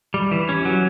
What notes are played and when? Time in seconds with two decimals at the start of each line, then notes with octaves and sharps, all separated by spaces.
0.14 G3
0.32 E3
0.49 C#4
0.65 F#3